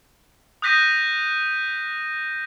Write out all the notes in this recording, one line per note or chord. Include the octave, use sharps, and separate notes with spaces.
D#6 F#6 G6 A#6 B6 D#7